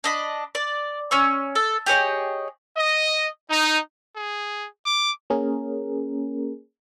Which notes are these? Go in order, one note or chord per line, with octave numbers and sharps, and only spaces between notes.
D4 D#5 B5
D5
C#4 C#6 E6
A4
G4 G#4 C#5 D#5
D#5
D#4
G#4
D6
A#3 C#4 G#4 A#4